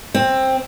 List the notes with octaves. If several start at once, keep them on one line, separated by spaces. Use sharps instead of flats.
C4